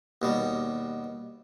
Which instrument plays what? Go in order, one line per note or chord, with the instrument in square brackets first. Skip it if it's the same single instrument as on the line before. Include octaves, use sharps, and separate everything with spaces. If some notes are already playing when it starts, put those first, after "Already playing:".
[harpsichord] D#2 B2 G3